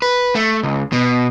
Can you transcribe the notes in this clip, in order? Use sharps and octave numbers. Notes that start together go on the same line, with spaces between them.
B4
A3
C#2
B2